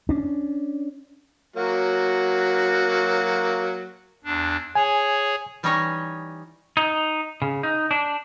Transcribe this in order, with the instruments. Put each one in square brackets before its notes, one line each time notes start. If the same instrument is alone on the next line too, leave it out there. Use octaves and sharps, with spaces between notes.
[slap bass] C#4 D4
[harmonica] F#3 A#3 F#4
[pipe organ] E2 D4
[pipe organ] G#4 C#5 [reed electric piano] G#5
[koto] E3 G3 C#4 D#4 C#5 D#5
[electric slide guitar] D#4
C#3
D#4
D4